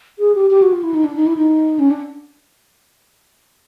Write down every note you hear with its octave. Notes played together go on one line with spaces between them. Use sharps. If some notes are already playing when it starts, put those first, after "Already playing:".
G#4
G4
G4
F#4
F4
E4
D#4
D4
D#4
E4
D#4
C#4
D4